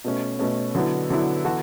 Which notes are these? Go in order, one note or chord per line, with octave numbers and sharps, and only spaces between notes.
B2 A3 C#4
B2 A3 C#4
D3 F#3 B3 E4
D3 F#3 B3 E4
E3 B3 F#4 A4